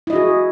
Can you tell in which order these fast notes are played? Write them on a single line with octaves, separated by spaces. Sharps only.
E4 D#5 F#4 G#4